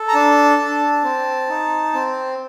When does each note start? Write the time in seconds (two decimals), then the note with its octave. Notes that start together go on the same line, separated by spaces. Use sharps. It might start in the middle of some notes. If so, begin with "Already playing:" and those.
Already playing: A4
0.08 A#5
0.14 D4 A5
0.59 D4
1.04 C4
1.49 D#4
1.94 C4